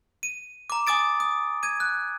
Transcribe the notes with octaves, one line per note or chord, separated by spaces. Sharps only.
D#7
A#5 D6
G#5 D6 D#6 A6 D7
D#6
G#6 D#7
F#6